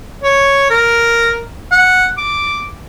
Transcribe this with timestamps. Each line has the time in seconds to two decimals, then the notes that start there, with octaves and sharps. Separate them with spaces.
0.23 C#5
0.70 A#4
1.72 F#5
2.18 D6